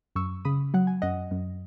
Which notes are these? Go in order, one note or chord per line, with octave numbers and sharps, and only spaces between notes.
F#2 C#6 E6
C#3 B5 D#6
F#3 F#5
G#5
F#2 D#5 F#5
F#2